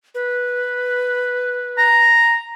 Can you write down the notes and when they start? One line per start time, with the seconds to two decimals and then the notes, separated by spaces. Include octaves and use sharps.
0.15 B4
1.78 A#5